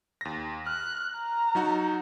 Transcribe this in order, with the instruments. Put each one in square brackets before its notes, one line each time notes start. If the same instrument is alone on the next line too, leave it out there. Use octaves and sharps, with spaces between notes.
[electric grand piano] D#2 A#6
[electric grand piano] F6 [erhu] F#6
[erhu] A#5
[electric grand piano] F#3 D#4 F#4